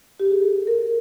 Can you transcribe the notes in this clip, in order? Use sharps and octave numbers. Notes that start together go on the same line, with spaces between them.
G4
G#4
A4
A#4